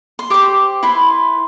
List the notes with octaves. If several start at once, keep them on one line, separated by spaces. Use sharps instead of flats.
C6
G4 C5 D6
E4 B4 C6